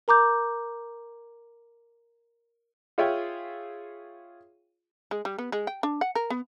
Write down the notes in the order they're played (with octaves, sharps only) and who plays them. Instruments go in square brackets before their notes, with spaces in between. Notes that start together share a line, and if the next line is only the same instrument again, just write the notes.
[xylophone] A#4 A#5 D6 G6
[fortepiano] F4 G#4 C#5 E5 F5 G5
[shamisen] G#3
G3
B3
G#3
G5
D4
F#5
A#4
B3